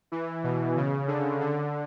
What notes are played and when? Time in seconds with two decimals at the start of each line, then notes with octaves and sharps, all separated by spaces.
0.12 E3
0.44 B2
0.77 C#3
1.08 D3
1.41 D3